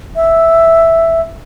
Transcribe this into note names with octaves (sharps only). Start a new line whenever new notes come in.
E5